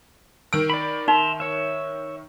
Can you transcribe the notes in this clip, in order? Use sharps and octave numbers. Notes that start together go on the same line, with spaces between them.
D#3 E6 D7
D5 B5
D#4 E5 A#5 C6
C#5 E5